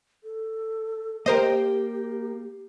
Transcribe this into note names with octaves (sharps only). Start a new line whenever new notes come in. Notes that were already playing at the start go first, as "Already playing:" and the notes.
A4
A#3 G4 A#4 C5 D#5 G5